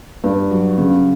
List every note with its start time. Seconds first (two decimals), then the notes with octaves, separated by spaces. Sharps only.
0.24 G2
0.51 F#3
0.78 C#3